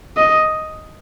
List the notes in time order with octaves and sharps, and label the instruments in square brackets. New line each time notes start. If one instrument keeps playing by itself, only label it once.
[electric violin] D#5